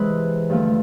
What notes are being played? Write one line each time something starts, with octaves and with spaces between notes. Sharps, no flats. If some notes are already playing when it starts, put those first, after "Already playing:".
Already playing: C3 E3 G#3 B4
G2 D3 F3 A3